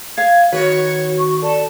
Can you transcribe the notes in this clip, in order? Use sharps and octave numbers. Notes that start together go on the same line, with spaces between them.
F5 G#6
D#3 F#4 B4 C#5
C#6
A4 D5 A5